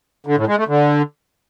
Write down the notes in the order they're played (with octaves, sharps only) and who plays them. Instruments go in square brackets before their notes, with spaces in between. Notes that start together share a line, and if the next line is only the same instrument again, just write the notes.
[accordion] D3
A2
G#3
A3
D3